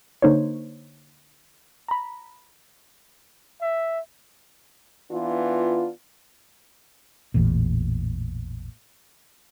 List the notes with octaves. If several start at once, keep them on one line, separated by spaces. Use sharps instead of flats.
D3 A#3 D#4 C5 C#5
A#5 B5
E5
E3 B3 D4 F4
A1 E2 A#2